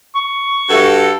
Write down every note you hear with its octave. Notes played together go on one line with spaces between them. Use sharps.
C#6
G2 F#4 A4